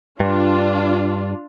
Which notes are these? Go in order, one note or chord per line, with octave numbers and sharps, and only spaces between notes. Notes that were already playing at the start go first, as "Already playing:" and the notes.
G2 D4 F4